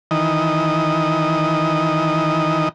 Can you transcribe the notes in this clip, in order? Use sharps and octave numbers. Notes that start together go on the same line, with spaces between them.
D#3 E3 D#5